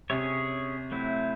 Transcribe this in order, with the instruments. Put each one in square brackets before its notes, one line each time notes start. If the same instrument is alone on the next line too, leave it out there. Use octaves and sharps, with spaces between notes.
[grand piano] C3 [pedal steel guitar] C#4 G#4 C#5
[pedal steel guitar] F#3 A3 C4 E4